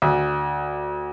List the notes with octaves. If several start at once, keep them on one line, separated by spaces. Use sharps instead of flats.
D2